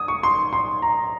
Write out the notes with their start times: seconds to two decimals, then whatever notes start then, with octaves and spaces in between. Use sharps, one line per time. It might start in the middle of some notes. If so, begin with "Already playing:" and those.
Already playing: D#6
0.08 C#6
0.23 C6
0.53 C6
0.82 A#5